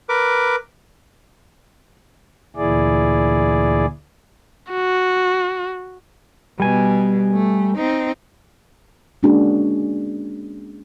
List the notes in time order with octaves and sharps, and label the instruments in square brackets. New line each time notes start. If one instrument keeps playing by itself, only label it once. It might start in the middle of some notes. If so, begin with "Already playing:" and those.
[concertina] A#4 B4 D6
[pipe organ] D2 A#2 E3 E4 G#4 D5
[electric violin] F#4
[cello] B2 [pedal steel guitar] G3 G#5
[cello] A3
C4 D#4
[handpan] G#3 A#3 C#4 D4 F#4 G#4